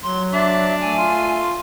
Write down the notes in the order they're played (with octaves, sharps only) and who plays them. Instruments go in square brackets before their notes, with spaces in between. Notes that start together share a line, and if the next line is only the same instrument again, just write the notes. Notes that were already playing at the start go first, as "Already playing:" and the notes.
[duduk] F#3 [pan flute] C6
[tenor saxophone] D4 [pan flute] E5
[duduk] A3 [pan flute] G#5
[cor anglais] F4